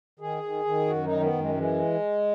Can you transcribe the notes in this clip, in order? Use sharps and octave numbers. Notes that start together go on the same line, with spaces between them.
D#3 G#4
D#3
D#3
F#2 F#4
D#4
D#3
B3
F#2
G#3
E3 G#3